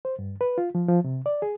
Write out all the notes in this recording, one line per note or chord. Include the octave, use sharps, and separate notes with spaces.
C5
G2
B4
F4
F3
F3
C3
D5
G#4